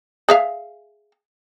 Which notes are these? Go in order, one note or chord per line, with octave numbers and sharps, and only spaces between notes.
G#4 E5 F5